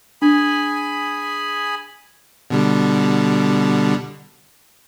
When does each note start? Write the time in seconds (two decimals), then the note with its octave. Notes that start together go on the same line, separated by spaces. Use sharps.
0.22 D4 G#4 G#5 B5
2.50 B2 D3 G3